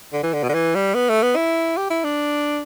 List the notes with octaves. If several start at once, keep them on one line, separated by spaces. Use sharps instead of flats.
D3
E3
D3
B2
D3
E3
G3
B3
A3
B3
E4
G4
E4
D4